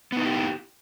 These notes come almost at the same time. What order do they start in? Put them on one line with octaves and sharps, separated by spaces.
B3 D#4 E4 G4